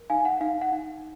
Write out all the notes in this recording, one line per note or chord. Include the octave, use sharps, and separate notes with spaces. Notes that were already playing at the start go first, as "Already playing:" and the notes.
Already playing: A#4
D#4 F5 G#5
F#5
D#4 F5
F#5
D#4